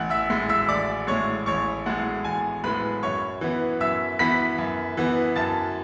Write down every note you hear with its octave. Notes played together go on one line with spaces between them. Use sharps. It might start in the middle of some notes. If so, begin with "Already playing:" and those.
Already playing: A1 F#5 F#6
E5 E6
A2 G#3
E5 E6
A1 D5 D6
A2 G#3 C#5 C#6
A1 C#5 C#6
A2 G#3 F#5
A1 G#5
A2 G#3 B4 B5
F#2 C#5 C#6
E3 B3
F#2 E5 E6
E3 B3 B5 B6
F#2
E3 B3
F#2 A5 A6